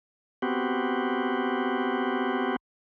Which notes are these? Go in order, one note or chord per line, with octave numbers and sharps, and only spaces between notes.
B3 C4 F#4 G4